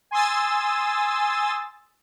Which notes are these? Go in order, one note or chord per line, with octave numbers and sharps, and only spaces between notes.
G#5 C6 D#6 E6 A6